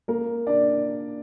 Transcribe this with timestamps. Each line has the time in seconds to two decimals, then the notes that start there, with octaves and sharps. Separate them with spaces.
0.08 A#3 A#4
0.47 D4 D5